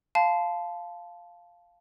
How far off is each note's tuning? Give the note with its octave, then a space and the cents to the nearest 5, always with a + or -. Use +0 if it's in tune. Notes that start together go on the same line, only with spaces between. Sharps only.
F5 +0 A5 -15 C6 -35